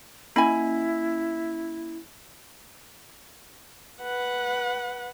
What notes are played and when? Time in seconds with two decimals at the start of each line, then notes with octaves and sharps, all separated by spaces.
0.36 A#3 C#4 E4 G#5 B5
4.02 B4 F#5